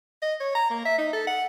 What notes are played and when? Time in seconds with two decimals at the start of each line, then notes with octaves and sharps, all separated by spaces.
0.22 D#5
0.40 C#5
0.55 A#5
0.70 A#3
0.85 E5
0.98 D#4
1.13 A4
1.27 F#5